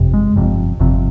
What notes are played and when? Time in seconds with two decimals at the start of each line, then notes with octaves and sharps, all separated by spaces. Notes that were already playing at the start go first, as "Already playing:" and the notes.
Already playing: G1 F2 C3
0.14 G#3
0.36 G1 F2 C3
0.80 G1 F2 C3